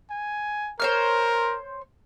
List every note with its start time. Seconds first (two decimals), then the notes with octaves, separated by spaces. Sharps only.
0.10 G#5
0.80 A#4 C5 C#5 F6